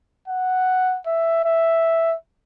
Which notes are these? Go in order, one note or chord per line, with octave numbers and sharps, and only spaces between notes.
F#5
E5
E5